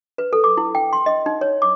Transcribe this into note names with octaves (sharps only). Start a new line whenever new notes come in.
B4
A4
D6
E4
G5
C6
D#5
D#4
C#5
D6